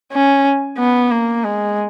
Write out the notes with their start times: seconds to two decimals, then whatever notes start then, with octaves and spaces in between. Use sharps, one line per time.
0.12 C#4
0.78 B3
1.11 A#3
1.44 G#3